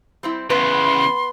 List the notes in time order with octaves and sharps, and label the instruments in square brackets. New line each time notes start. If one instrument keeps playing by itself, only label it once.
[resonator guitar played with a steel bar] G3 C4 E4
[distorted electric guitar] E2 C#3 [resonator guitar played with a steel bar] B3 B4 [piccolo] C6